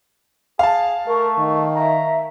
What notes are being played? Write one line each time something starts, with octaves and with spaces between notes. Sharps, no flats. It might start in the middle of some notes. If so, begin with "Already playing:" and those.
G#4 F5 A5
A3 A#4 C#6
D#3
E5 A#5